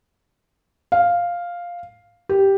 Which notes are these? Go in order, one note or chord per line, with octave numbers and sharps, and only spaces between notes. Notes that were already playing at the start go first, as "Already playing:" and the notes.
F5
G4